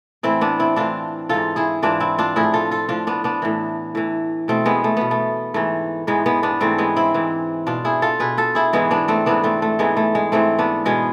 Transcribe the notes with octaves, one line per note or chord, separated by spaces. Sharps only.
A2 E3 C4 E4
B3 D4
C4 E4
A2 E3 D4 F4
G#2 E3 F4 A4
E4 G#4
G#2 E3 D4 F4
C4 E4
D4 F4
A2 F3 E4 G#4
F4 A4
F4 A4
A2 F3 D4 F4
B3 D4
B3 D4
A2 E3
A2 E3
B2 A3 C4
G#3 B3
A3
B2 B3
A3
G#2 E3 A3
G#2 E3 G#3 B3
G#3 B3
B3 D4
G#2 E3 A3 C4
G#3 B3
C4 E4
G#2 E3
B2 D4 F4
E4 G#4
F4 A4
B2 G#4 B4
F4 A4
E4 G#4
G#2 E3 G#3 B3
B3 D4
A3 C4
G#2 E3 B3 D4
A3 C4
A3
G#2 E3 G#3 B3
A3
G#3
G#2 E3 A3 C4
B3 D4
B2 G#3 B3